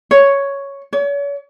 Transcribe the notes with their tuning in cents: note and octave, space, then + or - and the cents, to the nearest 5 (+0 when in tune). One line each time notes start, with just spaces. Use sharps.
C#5 +5
C#5 +40